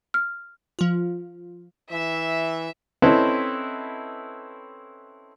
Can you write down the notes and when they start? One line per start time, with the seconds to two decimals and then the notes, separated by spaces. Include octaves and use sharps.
0.14 F6
0.79 F3 F4
1.92 E3 E5
3.02 C4 C#4 E4 A4 B4 D#5